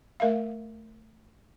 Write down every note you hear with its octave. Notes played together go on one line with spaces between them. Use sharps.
A3 A#4 E5 F5